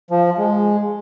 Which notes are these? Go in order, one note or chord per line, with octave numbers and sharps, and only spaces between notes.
F3
G#3